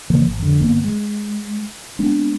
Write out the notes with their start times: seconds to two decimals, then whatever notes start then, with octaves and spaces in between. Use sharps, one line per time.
0.10 C#3 E3 F3 A#3
0.25 G#1
0.39 F2 D3
0.60 G1 A#3 B3
0.84 G#3
1.99 G#3 B3 C4 D4